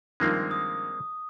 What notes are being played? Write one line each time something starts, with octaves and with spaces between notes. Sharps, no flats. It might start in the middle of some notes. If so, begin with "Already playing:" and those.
G2 D#3 F3 G#3 A#3 C4
D#6